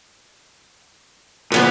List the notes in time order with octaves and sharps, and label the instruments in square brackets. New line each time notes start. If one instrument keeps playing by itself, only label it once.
[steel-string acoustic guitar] F2 C#3 F3 [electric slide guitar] A#2 B3